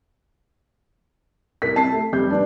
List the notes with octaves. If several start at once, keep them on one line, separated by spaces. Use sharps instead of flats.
C2 A#4 B6
C4 A5 C7
A3
F1 G3 C4 G4 G6
D4 B4 D5